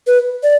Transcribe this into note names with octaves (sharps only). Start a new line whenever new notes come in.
B4
D5